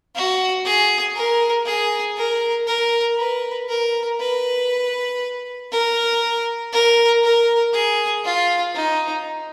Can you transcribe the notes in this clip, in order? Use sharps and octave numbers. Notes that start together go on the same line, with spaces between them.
F#4
G#4
A#4
G#4
A#4
A#4
B4
A#4
B4
A#4
A#4
A#4
G#4
F4
D#4